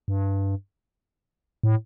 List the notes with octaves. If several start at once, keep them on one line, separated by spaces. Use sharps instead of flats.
G2
A2